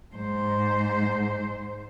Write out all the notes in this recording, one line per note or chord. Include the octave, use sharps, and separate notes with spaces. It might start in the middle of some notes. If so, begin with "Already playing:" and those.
G#2 C5